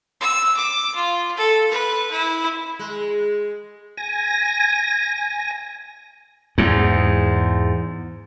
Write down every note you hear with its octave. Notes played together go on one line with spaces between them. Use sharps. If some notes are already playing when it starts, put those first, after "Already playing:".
E6
D6
F4
A4
B4
E4
G#3
G#5 A#6
E2 G#2